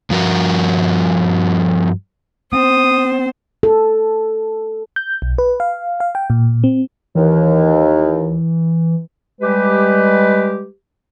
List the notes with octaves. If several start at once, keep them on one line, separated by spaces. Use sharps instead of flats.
G2 F3 F#4 A#4
B3 C4 C5 D#6
A4
G6
B1
B4
F5
F5
G5
A#2
C4
D#2 E3
G3 G#3 G4 B4